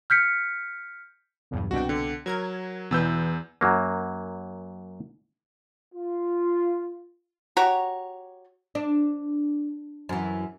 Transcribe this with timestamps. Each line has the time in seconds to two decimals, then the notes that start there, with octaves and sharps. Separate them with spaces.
0.10 F6 G6 B6 C#7
1.51 B1 E2 G2
1.71 C2 B2 D4 F#4 G5
1.89 D3
2.26 F#3 A#4 G#6
2.91 E2 B2 E3 B4 E6 G6
3.61 F#2 F#3 A#3
5.94 F4
7.57 F#4 G4 C#5 A#5
8.75 D4
10.09 F#2 E3